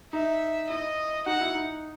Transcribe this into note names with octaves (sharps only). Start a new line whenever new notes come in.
D#4 E5
E4 D#5
D#4 F#4 F#5
E4
D#4